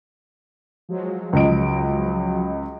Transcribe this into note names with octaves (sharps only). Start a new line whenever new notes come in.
F3 F#3 G#3
C#2 D#5 D7